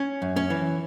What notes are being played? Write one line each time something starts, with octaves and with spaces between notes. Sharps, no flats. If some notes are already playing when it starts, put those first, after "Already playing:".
Already playing: C#4
F#2
C#4
E3